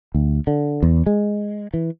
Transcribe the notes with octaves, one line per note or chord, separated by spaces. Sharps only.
D2
D3
E2
G#3
E3